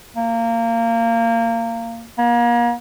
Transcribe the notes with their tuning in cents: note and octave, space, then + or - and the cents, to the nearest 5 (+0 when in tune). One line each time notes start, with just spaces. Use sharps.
A#3 -20
A#3 +35